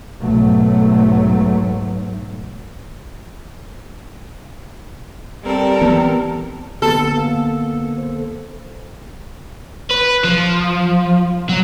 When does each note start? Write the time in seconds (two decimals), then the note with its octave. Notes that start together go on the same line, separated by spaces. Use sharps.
0.20 B1 G#2 F#3 A3
5.44 G3 C4 A4 A#4
5.82 E3 B3
6.82 D3 A#3 B3 A4
7.17 A#3 F5
7.98 C5
9.91 B4
10.24 F3
11.49 F#3